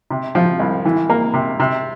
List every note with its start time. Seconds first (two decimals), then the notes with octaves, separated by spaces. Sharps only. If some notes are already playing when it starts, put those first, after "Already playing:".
0.11 C3
0.35 F3
0.60 C2
0.85 E3
1.10 A#3
1.34 C3
1.60 C3